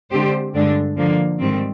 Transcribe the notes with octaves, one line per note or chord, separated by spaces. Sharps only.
D3 G#3 C4 G4 C5
G2 D3 G#3 D4
D3 F3 A#3
G#2 D#3 G3 C4